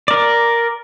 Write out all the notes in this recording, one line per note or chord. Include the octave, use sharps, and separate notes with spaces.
A#4 D5